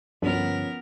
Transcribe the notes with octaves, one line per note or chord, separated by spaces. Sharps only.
C2 G2 D3 F3 B3 C#4 A#4